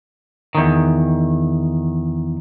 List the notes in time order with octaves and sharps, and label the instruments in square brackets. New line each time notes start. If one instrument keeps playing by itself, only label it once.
[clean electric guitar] E2 D#3